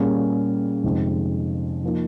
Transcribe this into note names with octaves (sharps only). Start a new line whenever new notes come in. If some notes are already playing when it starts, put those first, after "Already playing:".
Already playing: A#2 G3 A#3 C#4 G#4
F2 C3 D#3 G#3 C4
F3 A#3 D#4